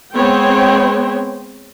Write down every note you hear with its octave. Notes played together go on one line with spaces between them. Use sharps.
G#3 B3 C4 C5 C#5 G5